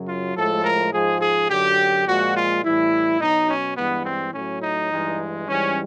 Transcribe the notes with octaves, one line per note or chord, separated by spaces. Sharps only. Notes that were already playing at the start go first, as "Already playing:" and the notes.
Already playing: F#2 C#3 F#3
F4
A2 F3 G#3 A4
A#4
G#2 F3 G#3 G#4
G#4
F#2 D3 F#3 G4
A#2 F3 G#3 F#4
F4
A2 E3 G3 E4
B2 F#3 D#4
C#4
G2 E3 G#3 B3
C4
A2 F#3 C#4
D#4
G2 E3 G#3
G#2 E3 G3 C#4